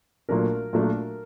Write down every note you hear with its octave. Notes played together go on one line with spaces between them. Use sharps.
A#2 F#3 A3 D4 A#4
A#2 F#3 A3 D4